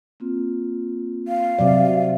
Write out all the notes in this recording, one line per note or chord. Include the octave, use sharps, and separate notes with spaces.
A#3 C4 F4
F5
C3 F#3 F#4 C5 D5 E5